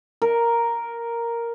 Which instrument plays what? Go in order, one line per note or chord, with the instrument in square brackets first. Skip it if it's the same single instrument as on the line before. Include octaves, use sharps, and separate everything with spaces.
[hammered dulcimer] A#4